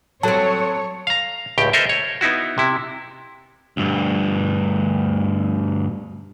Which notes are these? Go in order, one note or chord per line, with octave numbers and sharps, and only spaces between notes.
F#3 C4 A4 C#5 A5
F5 A#5
C#2 A2 G4 G5
A4 A#4 C5 D#5 E5
C#5
B3 D#4 E4 F#4
C3 E4
D2 G2